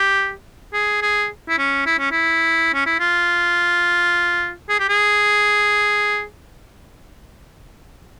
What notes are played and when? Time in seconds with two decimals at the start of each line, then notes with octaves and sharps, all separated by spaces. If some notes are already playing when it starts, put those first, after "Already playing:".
Already playing: G4
0.73 G#4
1.02 G#4
1.49 E4
1.58 C#4
1.86 E4
1.99 C#4
2.11 E4
2.74 C#4
2.86 E4
3.00 F4
4.69 G#4
4.79 G4
4.89 G#4